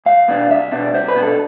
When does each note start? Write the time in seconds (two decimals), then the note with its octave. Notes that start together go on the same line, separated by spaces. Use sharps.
0.06 C2 F5
0.28 B2 B3 D4
0.50 C2 E5
0.72 B2 B3 D4
0.94 C2 C5
1.08 B4
1.16 B2 B3 D4
1.23 A4